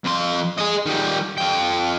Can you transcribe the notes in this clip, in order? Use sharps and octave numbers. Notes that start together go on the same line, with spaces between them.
F2 C6
G#4 D#5
D#3 G3
F2 G5